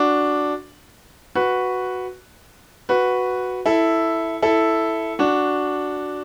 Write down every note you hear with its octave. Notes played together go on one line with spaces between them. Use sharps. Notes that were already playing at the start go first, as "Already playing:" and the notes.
Already playing: D4 F#4
F#4 B4
F#4 B4
E4 A4
E4 A4
D4 F#4